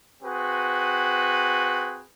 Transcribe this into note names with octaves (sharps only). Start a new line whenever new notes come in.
C4 F#4 G#4 B4